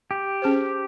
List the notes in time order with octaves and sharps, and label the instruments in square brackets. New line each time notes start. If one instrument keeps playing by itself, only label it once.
[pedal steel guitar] G4
[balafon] C#4 G#4 C5